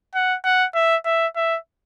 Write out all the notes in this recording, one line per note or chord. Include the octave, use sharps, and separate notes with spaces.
F#5
F#5
E5
E5
E5